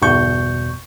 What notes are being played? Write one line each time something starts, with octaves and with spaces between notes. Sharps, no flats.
G1 E2 B2 C#6 G6